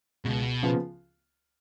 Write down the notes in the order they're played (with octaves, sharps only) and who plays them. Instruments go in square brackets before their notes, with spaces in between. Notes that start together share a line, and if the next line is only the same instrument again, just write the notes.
[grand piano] C#2 [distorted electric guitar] B2
[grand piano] C#3 F3 B3 F4